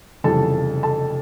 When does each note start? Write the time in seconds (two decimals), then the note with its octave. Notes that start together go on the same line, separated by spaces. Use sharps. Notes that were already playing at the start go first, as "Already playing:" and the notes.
0.24 F1 F2 C#3 E3 G3 A4 A5
0.83 A4 A5